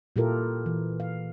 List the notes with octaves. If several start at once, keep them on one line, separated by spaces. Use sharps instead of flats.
A#2 E4 F4 G4 A4 A#4
E3
F5